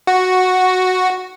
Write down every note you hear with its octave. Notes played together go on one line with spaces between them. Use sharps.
F#4